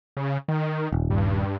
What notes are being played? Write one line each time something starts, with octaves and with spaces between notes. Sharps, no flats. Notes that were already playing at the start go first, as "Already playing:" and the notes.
C#3
D#3
D#1
G2